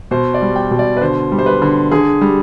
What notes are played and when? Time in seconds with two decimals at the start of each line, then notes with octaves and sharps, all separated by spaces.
0.11 B2 C5
0.34 D5
0.42 G3
0.56 G5
0.71 B2
0.79 D5
0.97 B4
1.01 D3 C5
1.32 G3
1.39 C5
1.46 B4
1.62 D3
1.92 D3 G#4
2.21 G3